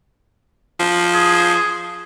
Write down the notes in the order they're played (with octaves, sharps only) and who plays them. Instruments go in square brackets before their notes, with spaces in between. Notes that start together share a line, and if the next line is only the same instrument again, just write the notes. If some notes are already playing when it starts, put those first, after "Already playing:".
[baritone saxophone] F3
[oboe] G#4